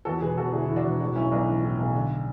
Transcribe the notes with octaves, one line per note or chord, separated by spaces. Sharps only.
E2 F#4 A4
E1 G#4 B4
E1 F#4 A4
D3 E4 G#4
E2 E4
D4 F#4
E1
A2 D4 F#4
B1 C#4 E4
B1 D4
E3
A2
B1
D3